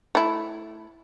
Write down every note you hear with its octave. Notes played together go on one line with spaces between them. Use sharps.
A3 E4